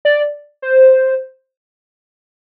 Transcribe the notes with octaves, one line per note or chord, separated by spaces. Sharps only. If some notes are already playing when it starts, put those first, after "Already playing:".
D5
C5